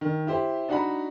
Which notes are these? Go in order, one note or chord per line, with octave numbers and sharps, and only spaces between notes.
D#3
E4 G4 C5
D4 D#4 F#4 F#5 A#5 B5